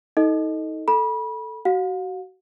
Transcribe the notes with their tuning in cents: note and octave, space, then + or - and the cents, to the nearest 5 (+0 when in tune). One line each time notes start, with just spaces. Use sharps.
D#4 +35 A4 +0 D#5 +0
A4 +0 B5 -30
F#4 +25 F5 +45